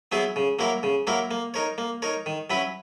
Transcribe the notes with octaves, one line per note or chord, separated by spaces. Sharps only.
F#3 B3 E4 G#4
C#3
F#3 A#3 E4 A#4
C#3
F#3 A#3 E4 A#4
A#3
D#4 A#4 C#5
A#3
D#4 A#4 C#5
D#3
F#3 C#4 E4 B4